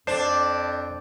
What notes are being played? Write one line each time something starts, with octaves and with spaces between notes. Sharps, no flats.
F2 D4 C5